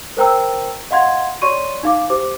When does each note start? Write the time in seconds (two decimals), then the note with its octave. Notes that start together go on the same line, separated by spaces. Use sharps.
0.17 A#4 C5 G5 A#5 E6
0.91 D#5 F5 F#5 C6 G#6
1.42 C#5 D5 C6 C#6 D#7
1.83 D#4 F5 D6
2.10 G4 C5 D6